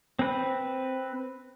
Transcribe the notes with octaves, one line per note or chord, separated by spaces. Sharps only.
C4 B4